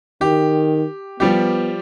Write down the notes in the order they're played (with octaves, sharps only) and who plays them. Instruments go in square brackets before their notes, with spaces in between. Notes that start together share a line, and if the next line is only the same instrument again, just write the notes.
[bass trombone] D#3 [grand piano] G4
[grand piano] F3 G3 G4 [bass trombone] B3